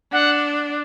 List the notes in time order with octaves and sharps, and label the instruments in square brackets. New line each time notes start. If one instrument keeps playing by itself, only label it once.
[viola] D4 [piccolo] F#5